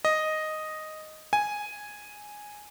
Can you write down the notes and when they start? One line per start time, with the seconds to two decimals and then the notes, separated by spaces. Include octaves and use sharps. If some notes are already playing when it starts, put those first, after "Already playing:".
0.05 D#5
1.33 G#5